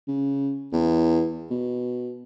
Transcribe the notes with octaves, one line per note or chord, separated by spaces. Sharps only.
C#3
E2
B2